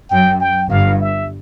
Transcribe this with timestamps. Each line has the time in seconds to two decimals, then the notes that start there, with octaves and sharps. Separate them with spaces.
0.10 F#2 G5
0.41 G5
0.70 G1 G2 F5
1.00 E5